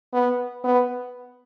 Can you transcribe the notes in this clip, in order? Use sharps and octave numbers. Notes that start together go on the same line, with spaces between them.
B3
B3